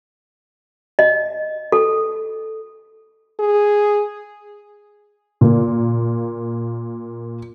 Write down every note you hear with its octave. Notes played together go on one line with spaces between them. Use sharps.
D#5
A4
G#4
A#2 A#3